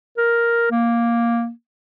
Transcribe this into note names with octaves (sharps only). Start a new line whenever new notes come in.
A#4
A#3